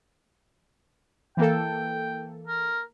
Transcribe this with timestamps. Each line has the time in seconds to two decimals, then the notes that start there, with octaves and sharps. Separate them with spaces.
1.37 E3 A#3 A4 G5
2.47 A#4